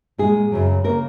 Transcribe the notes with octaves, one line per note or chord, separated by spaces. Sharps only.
A#2 G#3 G#4
F#2 C#3 F#3
C#3 A#3 A#4